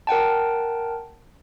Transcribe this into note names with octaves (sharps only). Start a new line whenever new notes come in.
A#4 F#5 G5 A5